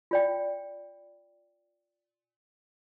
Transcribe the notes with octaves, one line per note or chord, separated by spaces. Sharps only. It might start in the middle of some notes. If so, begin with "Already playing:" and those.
F4 D5 G5